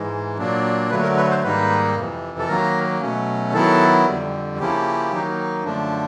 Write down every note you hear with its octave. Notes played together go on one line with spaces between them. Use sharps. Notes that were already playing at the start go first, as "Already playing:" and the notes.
Already playing: G#2 E3 G#3
A#2 F#3 A#3 D4
D3 F#3 A3 B4
A#4
B4
C5
G#2 D#3 G3 A#3 D#4 B4
F2 C3 E3
A4
D#3 F#3 A#3 A#4
B2 F#3 A3 C#4
D#3 F#3 B3 E4 A4
F2 D3 G3
C#3 F3 A#3 C#4 E4 G4
D#3 F#3 A#3 D#4
F#2 D3 F3 A3 D4